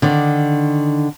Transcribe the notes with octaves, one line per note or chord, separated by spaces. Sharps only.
D3 D#3 D4